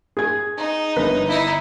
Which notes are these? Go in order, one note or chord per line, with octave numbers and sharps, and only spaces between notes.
G#4 G#6
D#4
G1 B4
D#4 E4